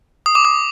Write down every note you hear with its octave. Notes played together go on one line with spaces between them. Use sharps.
D#6
D6
D#6